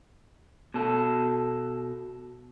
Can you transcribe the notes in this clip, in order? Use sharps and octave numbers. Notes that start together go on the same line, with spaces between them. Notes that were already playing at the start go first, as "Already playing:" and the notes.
B2 A4